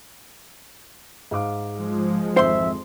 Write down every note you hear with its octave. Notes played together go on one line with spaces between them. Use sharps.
G#2 F5 D6
F3 G#3
G#1 F2 C5 E5 C6